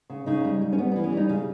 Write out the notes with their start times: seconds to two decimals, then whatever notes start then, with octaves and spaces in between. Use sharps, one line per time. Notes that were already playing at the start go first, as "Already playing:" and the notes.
0.10 C#3
0.26 C#3 D#4
0.45 G3
0.62 G3
0.72 C#4
0.78 G3 B3
0.92 E3 B3
1.04 C#4
1.12 G3 D#4
1.29 C#3 C#4